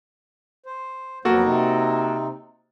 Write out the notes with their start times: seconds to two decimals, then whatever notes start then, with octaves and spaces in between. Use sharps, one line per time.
0.66 C5
1.25 F2 F#3 A#3 B3 F#4 A4
1.44 C3 C4 D#4